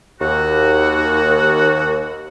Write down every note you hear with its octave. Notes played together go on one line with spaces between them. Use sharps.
D#2 F#4